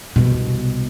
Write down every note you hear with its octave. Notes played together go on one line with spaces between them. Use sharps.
C2 B2